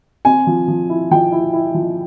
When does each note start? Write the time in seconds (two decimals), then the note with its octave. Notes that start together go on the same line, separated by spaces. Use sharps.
0.25 C4 G#5
0.47 F3
0.68 F3
0.89 E4
1.11 F3 G5
1.32 E4
1.53 E4
1.74 F3